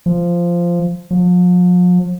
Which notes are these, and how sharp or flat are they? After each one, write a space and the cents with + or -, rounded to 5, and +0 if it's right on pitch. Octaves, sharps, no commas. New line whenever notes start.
F3 -10
F3 +40